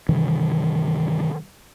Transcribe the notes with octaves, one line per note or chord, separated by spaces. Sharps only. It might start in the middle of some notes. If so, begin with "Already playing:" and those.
G2 C3 D#3 E3